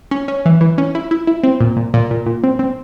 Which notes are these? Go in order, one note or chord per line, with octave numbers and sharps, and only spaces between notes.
C#4
C#4
E3
E3
C#4
E4
E4
E4
C4
A#2
A#2
A#2
A#2
A#2
C4
C4